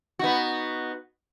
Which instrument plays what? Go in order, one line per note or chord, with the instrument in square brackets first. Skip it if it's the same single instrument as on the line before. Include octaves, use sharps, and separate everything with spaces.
[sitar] B3 D#4 F#4